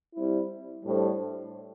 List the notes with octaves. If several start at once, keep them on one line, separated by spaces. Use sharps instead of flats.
G3 C4 E4
A2 G3 D4 A4 C5